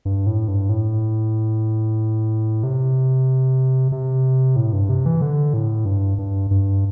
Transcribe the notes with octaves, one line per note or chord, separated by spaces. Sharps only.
G2
A2
G2
A2
C3
C3
A2
G2
C3
E3
D3
A2
G2
G2
G2